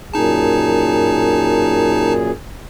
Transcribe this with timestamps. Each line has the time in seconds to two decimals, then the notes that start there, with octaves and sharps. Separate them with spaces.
0.14 F#2 A#2 D#4 G#4 A5